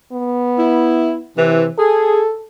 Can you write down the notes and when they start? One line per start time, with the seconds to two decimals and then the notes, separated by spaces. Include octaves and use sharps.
0.12 B3
0.58 E4
1.37 C3 E3
1.78 G#4 A4